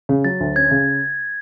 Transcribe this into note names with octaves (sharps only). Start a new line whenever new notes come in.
C#3
F#3 A6
D2
C#4 G#6
C#3